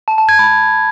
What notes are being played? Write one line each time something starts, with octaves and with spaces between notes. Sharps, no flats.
A5
A5
G#6
B5